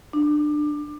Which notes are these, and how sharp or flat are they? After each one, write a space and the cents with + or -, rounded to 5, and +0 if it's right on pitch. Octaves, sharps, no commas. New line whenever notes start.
D4 +25